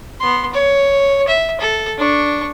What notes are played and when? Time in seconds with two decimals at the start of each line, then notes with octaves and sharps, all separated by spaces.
0.20 B3 C6
0.53 C#5
1.28 E5
1.60 A4
1.98 D4 C#6